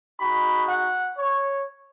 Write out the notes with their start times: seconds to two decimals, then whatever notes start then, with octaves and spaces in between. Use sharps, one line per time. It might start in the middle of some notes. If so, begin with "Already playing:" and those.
0.20 G#3 D#4 F#4 B5
0.69 F#5
1.19 C#5